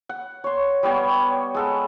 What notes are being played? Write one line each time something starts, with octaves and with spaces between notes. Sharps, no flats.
F#5
C#5 C6
G3 B3 C#5 G5
G#3 A4 F#5